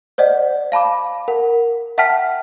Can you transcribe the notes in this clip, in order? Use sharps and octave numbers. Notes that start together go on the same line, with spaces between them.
C5 D5 D#5 F#5
F5 A5 B5 D6
A#4 F#5
E5 F#5 G5 A5 F6 B6